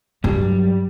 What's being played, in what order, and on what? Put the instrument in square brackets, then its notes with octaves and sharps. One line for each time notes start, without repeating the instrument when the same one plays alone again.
[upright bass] G2 F#3 [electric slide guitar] G3